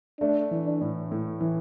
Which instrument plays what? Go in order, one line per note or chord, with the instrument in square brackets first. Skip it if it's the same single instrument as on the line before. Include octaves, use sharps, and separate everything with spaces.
[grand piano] A3 [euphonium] D4
[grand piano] E3
[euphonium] D4
[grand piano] A2
A2
E3